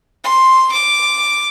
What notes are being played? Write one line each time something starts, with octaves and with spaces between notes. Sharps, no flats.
C6
D6